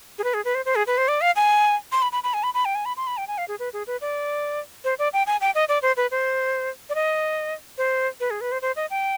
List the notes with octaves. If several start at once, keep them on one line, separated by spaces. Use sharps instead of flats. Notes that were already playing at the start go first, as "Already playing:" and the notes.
G#4
B4
G#4
B4
C5
C5
G#4
B4
C5
D5
F5
G#5
C6
B5
B5
B5
G#5
B5
B5
G5
G#5
B5
C6
B5
G5
G#5
F5
G#4
B4
G#4
B4
D5
C5
D5
G5
G#5
G5
D#5
D5
C5
B4
C5
D5
D#5
C5
B4
G#4
B4
C5
C5
D#5
G5